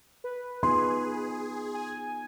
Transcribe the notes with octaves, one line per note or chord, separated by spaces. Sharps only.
B4
B3 D#4 F4 G#4 C6
G#5